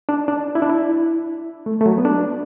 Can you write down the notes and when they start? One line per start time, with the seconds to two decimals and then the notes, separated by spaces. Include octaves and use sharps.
0.09 D4
0.28 D4
0.55 E4
0.62 D4
0.69 E4
1.66 A3
1.81 A3
1.86 F#3
1.98 B3
2.05 D4